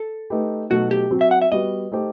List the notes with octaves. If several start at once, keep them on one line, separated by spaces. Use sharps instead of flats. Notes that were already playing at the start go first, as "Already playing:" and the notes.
Already playing: A4
A3 D#4 G4 B4
B2 F#3 A3 D#4 F#4
G4
F#3 C4 F#4
E5
F#5
E5
G3 B3 F#4 D#5
A3 D#4 G4 C5